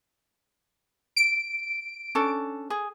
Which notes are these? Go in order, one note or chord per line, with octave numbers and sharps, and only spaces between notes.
D7
C#4 D4 A4
G#4